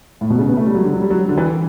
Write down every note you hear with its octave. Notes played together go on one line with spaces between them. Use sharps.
A2
B2
C#3
B3
A3
G3
F#3
D3
F#3
G3
F#3
D3
E3